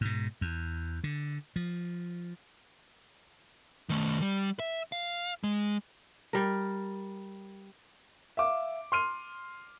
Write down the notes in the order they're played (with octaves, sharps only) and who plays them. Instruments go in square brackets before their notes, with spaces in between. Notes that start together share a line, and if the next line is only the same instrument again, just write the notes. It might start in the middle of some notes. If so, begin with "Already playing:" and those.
[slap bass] G#2 B2
E2
D3
F3
[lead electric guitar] D#3 A3
G3
E5
F5
G#3
[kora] G3 A#4
[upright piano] E5 F5 D6
C6 F6 D#7